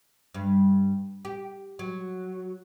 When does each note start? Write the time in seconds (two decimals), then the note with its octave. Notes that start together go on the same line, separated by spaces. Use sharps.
0.34 G2
1.25 G4
1.79 F#3